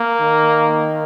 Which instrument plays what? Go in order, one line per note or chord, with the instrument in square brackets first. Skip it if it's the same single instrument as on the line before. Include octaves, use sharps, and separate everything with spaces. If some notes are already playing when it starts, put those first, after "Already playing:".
Already playing: [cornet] A#3
[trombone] D#3